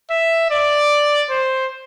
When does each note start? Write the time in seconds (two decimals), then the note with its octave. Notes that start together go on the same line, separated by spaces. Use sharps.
0.11 E5
0.51 D5
1.30 C5